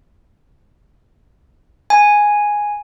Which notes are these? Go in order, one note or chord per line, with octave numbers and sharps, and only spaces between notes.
G#5